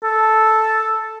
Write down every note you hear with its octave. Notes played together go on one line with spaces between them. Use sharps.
A4